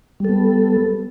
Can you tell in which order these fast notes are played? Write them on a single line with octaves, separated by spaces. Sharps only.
G3 A4 B3